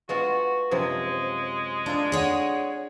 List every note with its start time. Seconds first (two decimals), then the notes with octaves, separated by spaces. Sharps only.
0.09 G#3 B3 F4 F#4
0.71 F#2 C3 F3 G#3
1.86 D4 F4 A4 A#5
2.12 G#4 C#5 F#5